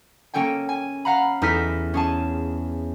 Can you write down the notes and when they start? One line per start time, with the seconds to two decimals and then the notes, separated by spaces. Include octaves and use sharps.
0.34 A#3 C#4 A4 G5 G#5
0.69 G#5
1.05 F5 F#5 A#5 B5
1.42 E2 D#4 A4 F6 B6
1.94 C#4 G#4 A5